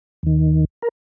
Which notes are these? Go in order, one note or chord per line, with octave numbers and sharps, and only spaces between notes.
D#2 D#3
A#4